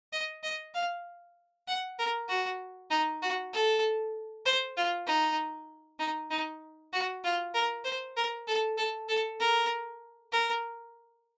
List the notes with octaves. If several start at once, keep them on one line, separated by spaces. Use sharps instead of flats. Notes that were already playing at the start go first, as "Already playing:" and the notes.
D#5
D#5
F5
F#5
A#4
F#4
D#4
F#4
A4
C5
F4
D#4
D#4
D#4
F#4
F4
A#4
C5
A#4
A4
A4
A4
A#4
A#4